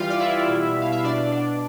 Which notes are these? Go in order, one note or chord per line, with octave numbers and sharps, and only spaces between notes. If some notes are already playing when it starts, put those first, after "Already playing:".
Already playing: E3 G3 F4 F5
D5
G3 E4 E5
B2
B2
F5
E5
B2 D4 D5
B2 D4 D5